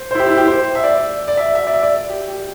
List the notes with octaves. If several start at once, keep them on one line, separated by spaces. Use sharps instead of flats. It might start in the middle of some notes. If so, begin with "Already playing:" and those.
Already playing: C5
E4 C5
G4
E4
G4
C5
E5
D5
D5
E5
E5
D5
E5
D5
G4
G4